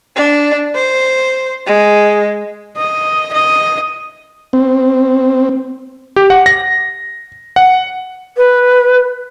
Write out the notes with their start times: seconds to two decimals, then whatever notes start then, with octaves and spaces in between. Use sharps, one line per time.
0.16 D4
0.75 C5
1.67 G#3
2.77 D#5
3.33 D#5
4.53 C4
6.16 G4
6.30 F#5
6.46 A#6
7.56 F#5
8.37 B4